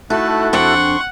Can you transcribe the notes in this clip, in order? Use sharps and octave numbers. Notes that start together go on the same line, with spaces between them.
A3 D#4 E4 F#4 A4 F#6
F2 D4 F#5 G5 C6 C#6